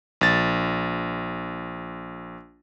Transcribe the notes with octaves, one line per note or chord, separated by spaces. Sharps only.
A#1 A6